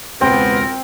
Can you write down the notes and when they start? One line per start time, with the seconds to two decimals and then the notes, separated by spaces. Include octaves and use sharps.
0.21 E1 C#2 B3 C4 A#4 D7